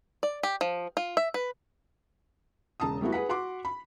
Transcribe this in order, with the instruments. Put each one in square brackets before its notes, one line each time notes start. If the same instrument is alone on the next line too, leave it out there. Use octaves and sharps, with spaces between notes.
[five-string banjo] D5
G4
F3
F4
E5
B4
[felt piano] E1 C#3 A5 A#5 D#6
G3 A3 B3 E4 F#4
G#4 B4 F#5 B6
F#4 F#5 C6 D6
B5